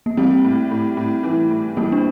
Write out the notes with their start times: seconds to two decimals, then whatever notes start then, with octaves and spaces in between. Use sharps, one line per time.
0.06 A#3
0.17 G3 C4
0.44 A2
0.71 A2
0.97 A2
1.23 E3
1.51 A2
1.77 G3 A#3
1.92 D4